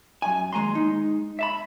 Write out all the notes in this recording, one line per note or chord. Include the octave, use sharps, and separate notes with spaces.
F#2 G#5
D#2 G#3 G#5 A#5 C6
G#3 D#4
E5 A5 B5